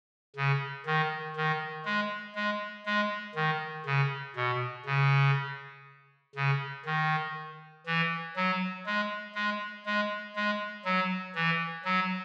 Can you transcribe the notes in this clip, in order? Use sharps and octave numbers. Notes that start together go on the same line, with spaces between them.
C#3
D#3
D#3
G#3
G#3
G#3
D#3
C#3
B2
C#3
C#3
D#3
E3
F#3
G#3
G#3
G#3
G#3
F#3
E3
F#3